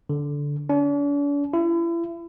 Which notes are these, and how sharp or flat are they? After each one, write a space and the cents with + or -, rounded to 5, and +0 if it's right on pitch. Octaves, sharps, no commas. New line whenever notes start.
D3 -15
D4 -45
E4 +35